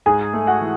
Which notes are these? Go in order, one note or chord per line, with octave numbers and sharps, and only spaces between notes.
G#2 G#4 G#5
A3
F#4 F#5
E3